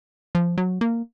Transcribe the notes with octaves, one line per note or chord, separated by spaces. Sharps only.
F3
F#3
A#3